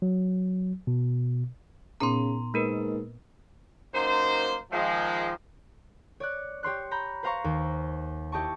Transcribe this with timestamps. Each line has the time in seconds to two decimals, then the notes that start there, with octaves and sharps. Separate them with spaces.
0.02 F#3
0.87 B2
2.00 A#2 C#3 B3 D#4 A#5 C6
2.54 G#2 A#3 A#4 B4
3.94 F#2 A#3 D#4 C5
4.71 D#3 F3 G#3
6.20 C#5 D5 F#6
6.63 G4 C#5 C6 F#6
6.91 A#5 B5 G6
7.23 B4 C5 F5 A#5 C#6
7.44 D#2
8.32 E4 G4 D#5 A5 C#6